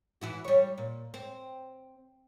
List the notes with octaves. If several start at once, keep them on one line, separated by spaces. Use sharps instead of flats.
E3 E4 F#4
G3 C#5
A#2
C4